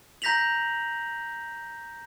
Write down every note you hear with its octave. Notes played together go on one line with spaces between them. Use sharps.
A#5 G6 A#6 B6 F7 F#7